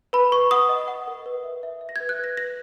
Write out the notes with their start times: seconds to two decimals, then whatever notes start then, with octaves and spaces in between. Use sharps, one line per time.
0.13 B4 B5
0.32 B4 C#6
0.51 F#5 D#6
0.69 D#5
0.88 F#5
1.08 A#4
1.26 B4
1.44 E5
1.63 E5
1.81 E5
1.89 A#6
1.96 G#6
2.00 B4
2.09 F#6
2.19 B4 A#6
2.37 B4 A#6